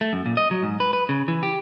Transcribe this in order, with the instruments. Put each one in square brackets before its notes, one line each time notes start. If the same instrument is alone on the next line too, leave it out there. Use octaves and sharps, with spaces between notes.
[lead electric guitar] A3
F#2
A#2
D#5
F#3
G#2
B4
B4
C#3
E3
G4